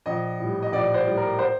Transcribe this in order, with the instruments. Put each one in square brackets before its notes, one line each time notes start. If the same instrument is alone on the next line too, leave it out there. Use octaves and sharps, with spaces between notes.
[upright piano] A#1 D#5
A2 G3
D#5
A#1 D5
C5
A2 G3
A#4
C5